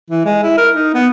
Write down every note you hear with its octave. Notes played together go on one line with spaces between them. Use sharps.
E3
G#3
E4
A#4
D#4
B3